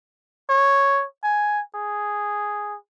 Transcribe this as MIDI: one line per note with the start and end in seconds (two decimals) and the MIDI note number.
0.49 1.05 73
1.24 1.61 80
1.75 2.76 68